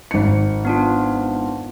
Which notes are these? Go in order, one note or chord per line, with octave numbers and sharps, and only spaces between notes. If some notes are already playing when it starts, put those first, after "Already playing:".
G#1 C#7
B3 D4 F4